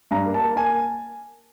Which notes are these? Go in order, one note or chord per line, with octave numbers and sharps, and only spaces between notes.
G2 A#5
A#3
A5
A#3
A#3 G#5